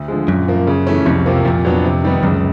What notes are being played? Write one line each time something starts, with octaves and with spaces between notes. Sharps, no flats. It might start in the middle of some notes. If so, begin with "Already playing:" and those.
Already playing: D2
D3 F3 G#3
F#2 A#2
F3 A#3
C#3
E3 A3 C#4
C2 F2
C3 F3 A#3
F2 A#2
F#3 B3 D4
C3
D#3 G3 B3 D#4
C#2 F#2